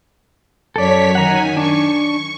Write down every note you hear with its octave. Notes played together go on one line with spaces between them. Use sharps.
F#2 A4 C#5 D5 B6
D#3 F#5 G#5 A#5
D4 C#6
C#6